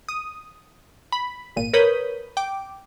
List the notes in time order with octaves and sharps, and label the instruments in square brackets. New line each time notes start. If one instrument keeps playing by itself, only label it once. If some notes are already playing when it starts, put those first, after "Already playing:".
[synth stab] D#6
B5
G#1 A#2 D#7
A#4 B4 C#5 B5 D#6 G6
G5 D6